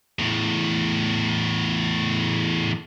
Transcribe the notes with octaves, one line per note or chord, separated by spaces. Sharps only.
E2 A2